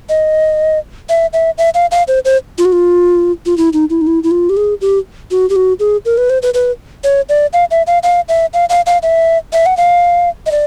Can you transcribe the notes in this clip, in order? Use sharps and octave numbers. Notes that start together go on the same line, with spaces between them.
D#5
E5
E5
E5
F5
F5
C5
C5
F4
F#4
F4
F4
E4
D#4
E4
D#4
E4
E4
F4
G4
G#4
G4
F#4
G4
F#4
G#4
A#4
B4
C5
B4
B4
C#5
D5
F5
E5
F5
F5
E5
F5
F5
F5
E5
E5
F#5
F5
D#5
D5